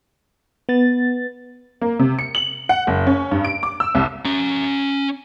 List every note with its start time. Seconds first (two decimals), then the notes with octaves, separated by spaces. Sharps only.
0.69 B3 A6
1.82 A#3
1.99 C3
2.19 C#7
2.35 F#7
2.69 F#5
2.87 F#1
3.07 C#4
3.31 G2
3.44 D7
3.63 D6
3.80 E6
3.95 C2
4.25 C#4 A#5